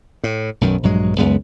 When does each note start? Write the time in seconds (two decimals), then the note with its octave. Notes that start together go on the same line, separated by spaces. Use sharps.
0.24 A2
0.61 B1 F#2 D#3
0.83 A#1 G2 F#3 G#3
1.18 C#2 F#2 G#3 B3